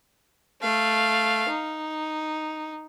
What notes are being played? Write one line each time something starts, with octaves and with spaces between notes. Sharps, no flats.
A3 F5
D#4